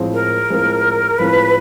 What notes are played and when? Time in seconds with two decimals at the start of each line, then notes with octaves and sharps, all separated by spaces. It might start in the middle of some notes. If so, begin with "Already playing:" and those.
Already playing: A2 F3 G#3 C4
0.14 A#4
0.50 A2 F3 G#3 C4
1.18 A2 F3 G#3 C4 B4